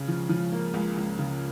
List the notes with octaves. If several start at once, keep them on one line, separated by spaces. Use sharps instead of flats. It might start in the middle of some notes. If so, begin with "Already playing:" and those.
Already playing: C#2 C#3
F3
F3
A#3
C#2
C#2
C#3